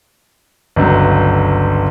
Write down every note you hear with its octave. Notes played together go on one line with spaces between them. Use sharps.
G1 C#2 F#3